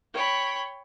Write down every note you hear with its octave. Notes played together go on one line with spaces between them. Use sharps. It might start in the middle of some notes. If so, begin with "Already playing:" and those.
C#5 G5 B5